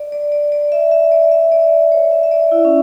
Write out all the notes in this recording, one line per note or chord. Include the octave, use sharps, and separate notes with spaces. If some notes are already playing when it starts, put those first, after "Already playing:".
Already playing: D5
D5
D5
D5
E5
E5
D5
E5
D5
C#5
E5
E5
D5
E4
C#4